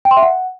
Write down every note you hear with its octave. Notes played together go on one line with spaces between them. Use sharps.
G5
C6
E5
F#5